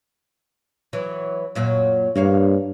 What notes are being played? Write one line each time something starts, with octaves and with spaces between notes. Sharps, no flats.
E3 F#3
F#2 A#2 F#3
G2 A#3 C#5 F5